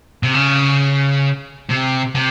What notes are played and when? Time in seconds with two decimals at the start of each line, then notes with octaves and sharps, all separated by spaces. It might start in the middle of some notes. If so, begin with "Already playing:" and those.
0.23 C3
0.34 C#3
1.70 C3
2.15 C3